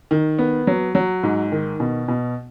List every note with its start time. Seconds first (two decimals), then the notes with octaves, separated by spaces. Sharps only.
0.11 D#3
0.38 B3
0.67 F#3
0.95 F#3
1.23 G#2
1.52 D#3
1.80 B2
2.08 B2